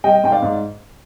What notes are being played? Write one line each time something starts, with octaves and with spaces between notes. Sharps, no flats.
G3 D#5 G5
G#2 G5
D5 F5
G#2